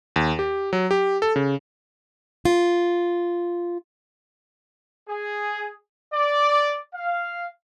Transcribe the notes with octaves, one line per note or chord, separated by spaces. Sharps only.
D#2
G4
F#3
G4
A4
C#3
F4
G#4
D5
F5